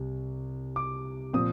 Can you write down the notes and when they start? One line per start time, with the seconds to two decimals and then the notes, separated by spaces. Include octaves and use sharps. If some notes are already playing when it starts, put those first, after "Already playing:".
Already playing: C2
0.76 D6
1.33 A#2 F3 C4 D#6